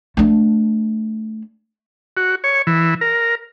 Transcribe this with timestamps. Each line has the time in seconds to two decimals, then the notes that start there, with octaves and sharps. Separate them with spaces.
0.17 A3 D4
2.17 F#4
2.44 C#5
2.67 E3
3.01 A#4